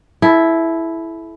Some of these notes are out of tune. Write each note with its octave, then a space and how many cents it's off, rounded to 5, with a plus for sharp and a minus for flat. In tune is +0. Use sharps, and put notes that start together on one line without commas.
E4 +0 A4 -35